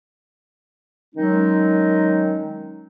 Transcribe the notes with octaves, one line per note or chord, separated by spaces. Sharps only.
D#3 F#3 G#3 C#4 D#4